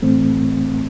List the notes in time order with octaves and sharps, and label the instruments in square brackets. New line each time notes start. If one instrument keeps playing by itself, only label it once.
[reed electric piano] A2 E3 A3 C4